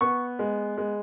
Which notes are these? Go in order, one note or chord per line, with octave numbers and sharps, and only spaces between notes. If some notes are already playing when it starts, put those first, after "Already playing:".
B3 C#6
G#3
G#3